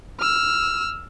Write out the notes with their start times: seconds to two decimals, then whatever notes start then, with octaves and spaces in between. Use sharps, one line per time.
0.20 E6 F6